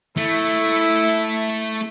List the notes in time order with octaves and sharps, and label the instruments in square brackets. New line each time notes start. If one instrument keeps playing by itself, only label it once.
[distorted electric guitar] A3 [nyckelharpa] E4